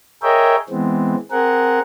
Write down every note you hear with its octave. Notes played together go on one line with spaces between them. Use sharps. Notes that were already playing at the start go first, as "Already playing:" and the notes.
G#4 A#4 C#5 D#5 E5 G5
E3 G#3 B3 C4
C4 G#4 A#4 F#5